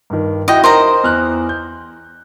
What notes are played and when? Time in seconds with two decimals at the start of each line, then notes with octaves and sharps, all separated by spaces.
0.10 G2 D#3
0.48 E4 F#4 D#5 G5 A#6
0.64 D#4 A#4 C5 D#5 A#5
1.03 E2 F6 F#6
1.49 G6